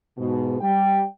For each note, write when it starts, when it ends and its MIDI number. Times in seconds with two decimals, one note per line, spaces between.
0.18 0.57 44
0.18 0.57 47
0.61 1.03 55
0.61 1.03 79